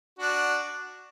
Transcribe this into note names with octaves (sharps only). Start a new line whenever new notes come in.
D4 F#4